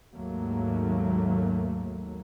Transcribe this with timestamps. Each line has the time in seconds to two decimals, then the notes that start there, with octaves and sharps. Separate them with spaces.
0.14 D#2 G#2 F#3 A3 A#3